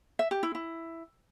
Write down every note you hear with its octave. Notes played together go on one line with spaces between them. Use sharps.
E5
G4
E4
E4